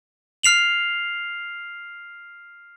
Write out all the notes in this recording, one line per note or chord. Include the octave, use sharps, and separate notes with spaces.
F6 C7 F7 F#7